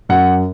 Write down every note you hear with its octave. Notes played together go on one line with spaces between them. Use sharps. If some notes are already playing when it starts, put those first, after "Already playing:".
F#2 F#5